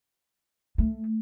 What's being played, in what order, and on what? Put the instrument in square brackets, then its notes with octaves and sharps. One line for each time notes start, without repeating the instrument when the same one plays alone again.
[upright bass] A3